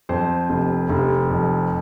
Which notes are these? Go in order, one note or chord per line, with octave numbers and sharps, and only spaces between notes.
F2 C5
F1
F1
F2